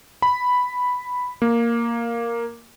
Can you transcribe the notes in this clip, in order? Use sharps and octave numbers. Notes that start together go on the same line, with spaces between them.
B5
A#3